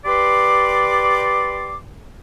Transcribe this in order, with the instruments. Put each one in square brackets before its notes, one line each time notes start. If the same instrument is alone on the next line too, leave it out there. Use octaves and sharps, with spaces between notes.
[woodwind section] G4 B4 D5 C6 D6